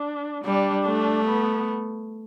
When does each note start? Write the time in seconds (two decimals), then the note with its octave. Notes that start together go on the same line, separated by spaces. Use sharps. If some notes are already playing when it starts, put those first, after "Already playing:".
Already playing: D4
0.44 G3 D4
0.85 A3
1.25 B3